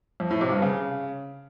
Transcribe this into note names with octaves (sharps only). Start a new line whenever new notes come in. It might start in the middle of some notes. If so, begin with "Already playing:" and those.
F2
A2
C3
G2
C#3